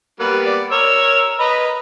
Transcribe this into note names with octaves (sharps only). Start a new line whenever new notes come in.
G3 A#3 B3 B4
D5
A#4 C#5 E6
B4 D#5 A#5 B5